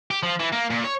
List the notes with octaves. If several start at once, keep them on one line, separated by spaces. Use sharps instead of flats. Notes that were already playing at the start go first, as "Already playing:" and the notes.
G4
F3
E3
A#3
A#2
C#5